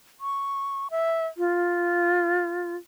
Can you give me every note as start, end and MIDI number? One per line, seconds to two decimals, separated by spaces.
0.20 0.88 85
0.91 1.27 76
1.37 2.76 65